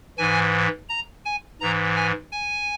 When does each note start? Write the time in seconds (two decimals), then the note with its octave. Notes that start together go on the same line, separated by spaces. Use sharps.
0.18 G#2 E3 G#5
0.89 A#5
1.25 G#5
1.61 G#2 E3 A#5
1.96 G#5
2.32 G#5